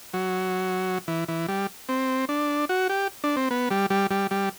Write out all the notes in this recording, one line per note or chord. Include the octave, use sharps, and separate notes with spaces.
F#3
E3
E3
G3
C4
D4
F#4
G4
D4
C4
B3
G3
G3
G3
G3